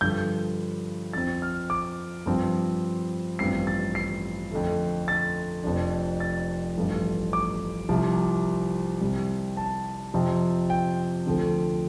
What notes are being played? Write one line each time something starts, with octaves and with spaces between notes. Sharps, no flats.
G2 D3 F3 G6
F2 F3 C4 A6
F6
D6
G2 F3 C4
A1 G2 F3 C4 C7
A6
C7
F2 D3 A3
A6
F1 F2 F3 D4
A6
A1 G2 F3 A3
D6
C2 C3 F3
C2 C3 G3 C4
A5
F2 C3 F3 C4
G5
D2 D3 F3 C4